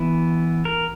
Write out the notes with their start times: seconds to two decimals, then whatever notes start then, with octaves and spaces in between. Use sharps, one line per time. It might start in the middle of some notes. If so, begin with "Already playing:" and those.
Already playing: E3 B3 E4
0.65 A#4